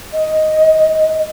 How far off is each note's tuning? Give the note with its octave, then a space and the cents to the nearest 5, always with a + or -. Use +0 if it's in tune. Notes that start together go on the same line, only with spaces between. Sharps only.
D#5 +5